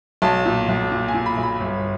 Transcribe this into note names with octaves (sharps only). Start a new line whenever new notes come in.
B1 A5
A#2
B1
A#2
G#5
A#2
B5
B1
B5
G1